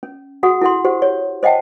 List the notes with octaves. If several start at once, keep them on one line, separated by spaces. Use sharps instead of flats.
C#4
F#4 G#4 F#5 D#6
E4 A4 F#5 C6
G4 C5 F#5
C#5
C5 D#5 F#5 G5 A5